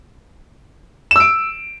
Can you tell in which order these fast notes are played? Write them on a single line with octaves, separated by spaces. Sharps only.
E7 E6 D7